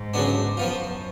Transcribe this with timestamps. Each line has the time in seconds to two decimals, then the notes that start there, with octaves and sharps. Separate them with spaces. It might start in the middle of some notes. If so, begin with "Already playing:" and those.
Already playing: G#2
0.14 C#3 F#3 B3 D4
0.57 F#2 F3 B3 F4